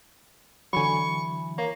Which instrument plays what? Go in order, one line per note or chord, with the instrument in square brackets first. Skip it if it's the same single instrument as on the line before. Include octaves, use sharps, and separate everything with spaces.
[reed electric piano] D3 F#3 [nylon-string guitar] E3 G#5 [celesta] B5 [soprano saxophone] C#6
[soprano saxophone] A#3 [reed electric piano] C#5